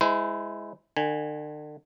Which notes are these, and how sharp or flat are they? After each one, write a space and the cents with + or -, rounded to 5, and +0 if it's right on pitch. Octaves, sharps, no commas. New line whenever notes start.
G#3 +0 E4 +0 C5 -40
D3 +40 G#5 -10